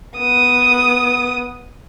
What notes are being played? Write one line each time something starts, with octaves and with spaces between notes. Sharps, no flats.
B3 D#6